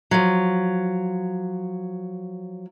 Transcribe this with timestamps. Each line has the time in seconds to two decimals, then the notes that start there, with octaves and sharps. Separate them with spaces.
0.11 F3 F#3